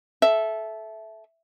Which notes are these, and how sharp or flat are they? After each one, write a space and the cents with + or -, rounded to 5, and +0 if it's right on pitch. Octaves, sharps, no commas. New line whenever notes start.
A4 -20 E5 +0